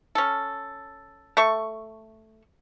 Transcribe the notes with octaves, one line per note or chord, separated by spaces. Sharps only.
C#4 A4
A3 A4 C#6